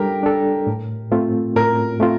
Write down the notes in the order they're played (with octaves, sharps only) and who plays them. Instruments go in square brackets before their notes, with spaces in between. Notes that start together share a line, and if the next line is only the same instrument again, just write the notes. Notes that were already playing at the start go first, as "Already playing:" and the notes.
Already playing: [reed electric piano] G3 D4 A4 [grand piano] G4 A#4
[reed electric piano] D4 A4
A2
A3 C4 F4
[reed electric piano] A2 [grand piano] A#4
[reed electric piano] A3 C4 F4